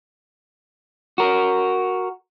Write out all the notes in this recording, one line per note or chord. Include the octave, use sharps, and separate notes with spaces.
F#4 A#4